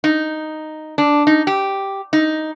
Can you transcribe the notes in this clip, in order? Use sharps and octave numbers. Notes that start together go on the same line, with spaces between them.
D#4
D4
D#4
G4
D#4